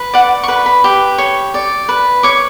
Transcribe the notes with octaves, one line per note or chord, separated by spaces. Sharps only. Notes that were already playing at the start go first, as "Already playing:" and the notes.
Already playing: B4
D5 F#5
C#6
B4 B5
B5
G4
C#5
D5
B4
C#5 D6